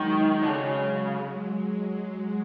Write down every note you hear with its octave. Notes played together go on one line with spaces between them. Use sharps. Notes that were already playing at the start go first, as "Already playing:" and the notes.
Already playing: D#3 F#3 G#3
D3
C#3